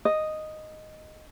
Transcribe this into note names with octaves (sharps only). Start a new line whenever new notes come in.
D#5